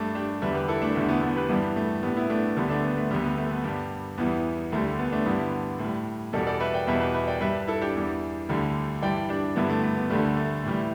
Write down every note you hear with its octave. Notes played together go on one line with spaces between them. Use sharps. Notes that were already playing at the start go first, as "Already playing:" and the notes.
Already playing: G2 G3 A3 D4
D4 G4
E2 D3 G3 B4 E5
G4 B4
E4 A4
A3 D4
E2 D3 G3 A3 D4
B3 E4
B3
G4 B4
G2 E3 G3 B3
A3
A2 G3 B3
B3 E4
A3 D4
D2 D3 G3 B3
A3 D4
B3
A3
D2 D3 G3 B3
B3
A3
B3
G2 G3
E2 E3 G3 B3
D2 D3 G3 A3
A3
B3
A3 D4
G2 D3 G3 B3 E4
A2
G3
E2 B2 G3 A4 D5
A4 D5
B4 E5
D5 G5
E2 B2 G3 B4 E5
G4 B4
B4 E5
D5 G5
G2 G3 B4 E5
E4 A4
D4 G4
E2 E3 G3
D2 D3 G3
G2 E3 G3 D5 G5
D4 G4
G2 D3 G3 B3 E4
A3
A3
B3
D2 D3 G3 A3 D4
A3
A2 E3 G3